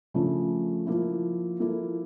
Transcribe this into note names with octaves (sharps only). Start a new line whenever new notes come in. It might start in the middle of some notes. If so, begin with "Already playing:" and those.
C#3 F3 A3 D4 A4
F3 A#3 E4
F3 A#3 E4 A4